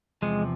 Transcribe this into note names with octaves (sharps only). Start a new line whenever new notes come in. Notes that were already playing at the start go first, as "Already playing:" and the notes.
E2 C3 F3 G#3